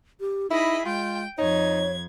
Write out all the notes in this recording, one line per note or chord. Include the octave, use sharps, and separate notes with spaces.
G4
D#4 E4 G#4 D#5 B5
G#3 F4 G5
F2 D#4 C#5 G#6